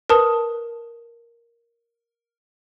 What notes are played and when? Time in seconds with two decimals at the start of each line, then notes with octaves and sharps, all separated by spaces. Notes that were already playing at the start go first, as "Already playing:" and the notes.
0.10 A#4 B4 A5 D#6